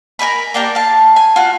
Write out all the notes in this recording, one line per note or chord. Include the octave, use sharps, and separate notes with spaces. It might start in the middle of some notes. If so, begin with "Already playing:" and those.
A#4 C#5 G#5 B5
A#3 D4 G4 A#4
F5 A5
G#5
F4 F#4